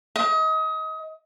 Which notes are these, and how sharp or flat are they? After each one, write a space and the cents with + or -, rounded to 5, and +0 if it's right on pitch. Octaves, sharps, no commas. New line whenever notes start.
D#5 +30